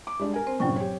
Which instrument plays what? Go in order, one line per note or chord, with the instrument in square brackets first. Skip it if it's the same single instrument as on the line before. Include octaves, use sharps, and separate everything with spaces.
[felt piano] D6
G3 G#3 D4
A#4 G#5
[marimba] C4 C5
[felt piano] G2 A#2 C#3 [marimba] F#3 G5 C#6
[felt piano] G4 C#5